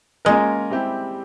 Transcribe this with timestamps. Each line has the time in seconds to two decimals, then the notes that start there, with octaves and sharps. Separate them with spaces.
0.25 G#3 A#3 C#4 F4 A#4
0.70 G3 C4 E4 G4